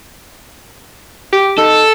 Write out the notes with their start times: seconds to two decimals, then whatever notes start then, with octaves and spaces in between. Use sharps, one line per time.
1.33 G4
1.58 D#4 A4